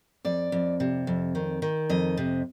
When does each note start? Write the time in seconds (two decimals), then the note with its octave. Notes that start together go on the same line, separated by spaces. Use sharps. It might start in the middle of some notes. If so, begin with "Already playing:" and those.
0.25 F2 D5
0.52 F2
0.80 C3
1.07 F2
1.35 D#3
1.62 D#3
1.90 F2 D#5
2.17 C3